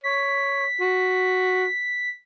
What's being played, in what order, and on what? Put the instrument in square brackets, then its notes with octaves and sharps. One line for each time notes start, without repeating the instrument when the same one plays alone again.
[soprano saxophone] C#5 [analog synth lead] B6
[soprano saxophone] F#4